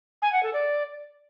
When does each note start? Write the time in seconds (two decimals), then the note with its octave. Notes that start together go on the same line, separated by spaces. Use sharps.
0.22 G#5
0.32 F#5
0.43 A4
0.53 D5